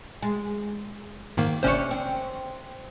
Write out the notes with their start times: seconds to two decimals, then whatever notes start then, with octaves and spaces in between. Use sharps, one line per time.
0.22 G#3
1.37 G#2 D#3 A#3
1.63 G1 C3 C#4 D4 C5 C#5
1.91 C4